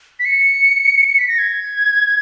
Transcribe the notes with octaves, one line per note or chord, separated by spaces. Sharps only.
B6
C#7
C#7
B6
A#6
G#6